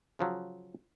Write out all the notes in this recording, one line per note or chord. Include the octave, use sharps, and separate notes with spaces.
C#3 F3 F#3